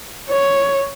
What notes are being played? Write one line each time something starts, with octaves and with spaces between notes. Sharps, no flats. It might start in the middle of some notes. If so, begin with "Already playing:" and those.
C#5